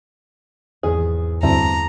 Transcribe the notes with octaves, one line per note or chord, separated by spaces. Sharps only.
G#1 E2 G#4
D2 G2 C4 E4 A5 A#5 D6